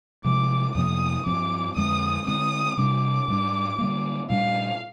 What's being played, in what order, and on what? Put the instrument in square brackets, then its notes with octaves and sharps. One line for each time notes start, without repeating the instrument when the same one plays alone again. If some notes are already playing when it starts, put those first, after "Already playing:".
[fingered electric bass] C3 F3 G#3 [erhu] D6
[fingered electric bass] F2 C3 F3 A#3 [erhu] D#6
[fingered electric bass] G2 F3 C4 [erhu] D6
[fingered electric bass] F2 D3 G#3 [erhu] D#6
[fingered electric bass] D3 G#3 C4 [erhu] D#6
[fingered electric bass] C3 G3 D4 [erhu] D6
[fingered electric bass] G#2 G3 D4
D3 G3 A#3
[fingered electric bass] A#2 G3 D4 [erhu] F5